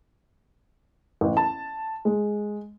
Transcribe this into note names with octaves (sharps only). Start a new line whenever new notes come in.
A1
A5
G#3